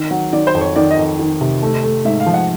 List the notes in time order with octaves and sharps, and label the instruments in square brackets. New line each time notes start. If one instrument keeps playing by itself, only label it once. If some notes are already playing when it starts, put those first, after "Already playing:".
Already playing: [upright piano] D#3
F#3
[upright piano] D#3 [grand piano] D5
[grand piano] C5
[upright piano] F2
[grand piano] C#5
[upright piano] D#3 [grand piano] D5
[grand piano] D#5
[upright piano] F2
D#3
C3
A3
A3
[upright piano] G#2 [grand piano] E5
[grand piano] F5
[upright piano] F3
[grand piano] F#5